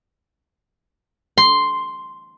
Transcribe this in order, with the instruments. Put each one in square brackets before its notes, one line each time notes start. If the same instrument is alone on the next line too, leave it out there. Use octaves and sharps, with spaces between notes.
[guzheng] C6